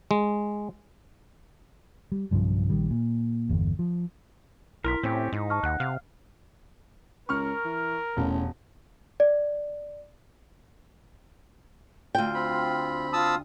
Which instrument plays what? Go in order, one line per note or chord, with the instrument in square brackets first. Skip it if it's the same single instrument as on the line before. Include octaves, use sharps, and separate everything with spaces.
[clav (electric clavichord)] G#3
[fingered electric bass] G3
B1 G2 C#3 F3
A#1 D#3 G3
A#2
G1 E2
F3
[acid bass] B1 [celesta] E4 C6 B6 [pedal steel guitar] A#4
[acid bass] A2 [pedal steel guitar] C4 C#4 G4
[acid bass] G#2 [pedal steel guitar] D#4
[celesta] A5 C#6 F6
[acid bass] D#2 [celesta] F#5 F#6
[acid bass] C3 [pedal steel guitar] F5
[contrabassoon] C#2 [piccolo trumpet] A#4 [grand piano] C#6 F6
[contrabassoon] E3
[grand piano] E1 [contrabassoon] A1
[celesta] D5
[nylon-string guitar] D2 G5 [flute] F4
[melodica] C4 B5
[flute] F4 [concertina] A5 D#6 E6